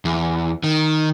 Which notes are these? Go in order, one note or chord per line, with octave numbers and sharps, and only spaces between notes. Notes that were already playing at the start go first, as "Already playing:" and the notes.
E2
D#3